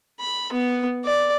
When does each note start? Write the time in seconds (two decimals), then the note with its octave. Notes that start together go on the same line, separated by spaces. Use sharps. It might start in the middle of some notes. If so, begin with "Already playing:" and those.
0.20 B5
0.53 B3
1.05 D5